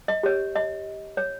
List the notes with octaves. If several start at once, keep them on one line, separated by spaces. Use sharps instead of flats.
D#5
G4 C#5
D#5
C#5